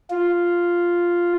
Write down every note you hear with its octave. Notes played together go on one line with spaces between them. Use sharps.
F4